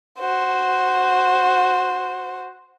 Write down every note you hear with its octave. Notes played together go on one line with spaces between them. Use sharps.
F#4 C5